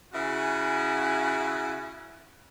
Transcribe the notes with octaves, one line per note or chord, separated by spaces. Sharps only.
C#3 E4 F#4 G#5